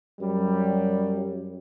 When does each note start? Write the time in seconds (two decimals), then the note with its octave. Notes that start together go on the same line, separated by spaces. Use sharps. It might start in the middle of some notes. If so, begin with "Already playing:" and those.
0.21 F#2 F#3 G3